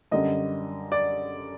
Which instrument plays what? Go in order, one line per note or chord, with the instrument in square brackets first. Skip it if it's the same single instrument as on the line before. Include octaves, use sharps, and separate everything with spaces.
[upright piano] F#2 D3 G3 [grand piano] D#5
[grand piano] D5